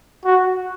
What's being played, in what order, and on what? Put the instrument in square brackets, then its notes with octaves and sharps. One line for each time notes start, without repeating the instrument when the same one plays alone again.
[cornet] F#4